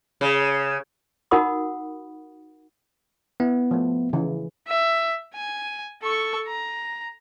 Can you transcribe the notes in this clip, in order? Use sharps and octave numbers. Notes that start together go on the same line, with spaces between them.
C#3
D#4 F#4 A#4 F#5 B5 D#6
B3 E4
F3 A3
C#3 E3
E5
G#5
A4 C#6
A#5